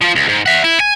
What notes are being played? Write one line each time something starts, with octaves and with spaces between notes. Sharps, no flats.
F3 F4
C#2
G#2
E5 F#5
E4
G#5